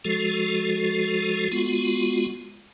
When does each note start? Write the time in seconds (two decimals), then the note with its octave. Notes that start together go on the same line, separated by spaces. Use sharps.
0.05 F3 G#3 F#4 A4
1.52 G#3 B3 F4 F#4